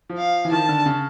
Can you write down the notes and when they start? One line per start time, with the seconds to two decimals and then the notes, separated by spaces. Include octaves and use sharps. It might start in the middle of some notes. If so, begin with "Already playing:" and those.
0.09 F3
0.18 F5
0.45 E3
0.51 D#3 A5
0.69 D3
0.86 C#3